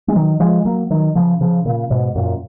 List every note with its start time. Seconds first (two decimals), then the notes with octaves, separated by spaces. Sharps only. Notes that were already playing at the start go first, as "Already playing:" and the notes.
0.08 G#3
0.15 D#3 F#3
0.40 F3 G#3
0.65 F#3 A#3
0.90 D#3 F#3
1.15 C#3 F3
1.41 C#3 F3
1.65 A#2 C#3
1.90 G#2 B2
2.15 F#2 A#2